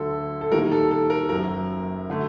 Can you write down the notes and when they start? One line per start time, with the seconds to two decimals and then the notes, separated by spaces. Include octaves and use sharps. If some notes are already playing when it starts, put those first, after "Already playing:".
Already playing: D2 D3 F#3 A4
0.41 A4
0.52 D#2 D#3 G3 A#3 A#4
0.72 A4
0.91 A4
1.10 A#4
1.29 F#1 F#2 F#3 A#4
2.10 D3 A3